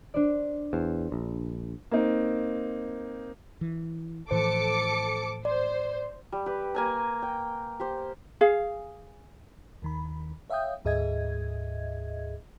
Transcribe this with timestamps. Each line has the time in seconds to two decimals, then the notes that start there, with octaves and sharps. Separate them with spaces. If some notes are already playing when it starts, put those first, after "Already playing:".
0.14 D4 C5 D5
0.73 E2 C5
1.12 A#1
1.91 A#3 C4 D#4
3.61 E3
4.31 A2 E3 F3 A4 C5 D6 C#7
5.45 C5 D5
6.32 G3
6.46 G4 B4
6.75 A#3 G#5 A#5
7.22 G5
7.80 G4 C5
8.41 G#4 F5
9.82 D#2 D#3 B5
10.50 C#5 E5 F5 G5 D#6 G6
10.85 D2 G#2 G#4 D#5 E5 G#6